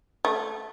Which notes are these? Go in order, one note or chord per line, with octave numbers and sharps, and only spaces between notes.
A3